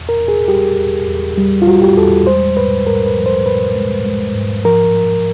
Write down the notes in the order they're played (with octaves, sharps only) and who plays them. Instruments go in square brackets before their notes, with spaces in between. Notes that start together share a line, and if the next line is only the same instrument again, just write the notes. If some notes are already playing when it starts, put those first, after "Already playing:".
Already playing: [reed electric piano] E2
A#4
E2
G#4
G3 G4
E2
E2
G3
F4
G3 F#4
G4
E2 A4
G#3 C5
G#2 B4
G#2 A#4
B4
F3
C5
G#2 B4
G#3
G#3
G#2
F3 A#4
F3